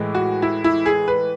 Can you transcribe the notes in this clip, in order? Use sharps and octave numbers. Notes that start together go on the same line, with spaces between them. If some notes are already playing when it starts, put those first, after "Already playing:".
Already playing: A2 E3 G#3
F#4
E4
E4
G#4
B4